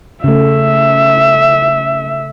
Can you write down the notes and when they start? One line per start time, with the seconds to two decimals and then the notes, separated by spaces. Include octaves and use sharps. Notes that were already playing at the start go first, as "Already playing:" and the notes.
0.24 C#3 A3 E5